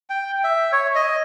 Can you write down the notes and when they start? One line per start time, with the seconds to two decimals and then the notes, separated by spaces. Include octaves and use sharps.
0.10 G5
0.44 E5
0.72 C#5
0.95 D#5